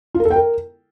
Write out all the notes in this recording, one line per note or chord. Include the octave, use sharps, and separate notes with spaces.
F4
A#4
A4
G5
A#4